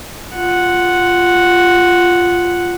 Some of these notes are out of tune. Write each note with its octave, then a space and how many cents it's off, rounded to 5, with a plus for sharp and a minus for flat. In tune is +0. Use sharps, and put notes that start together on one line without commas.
F4 +0 F#5 +0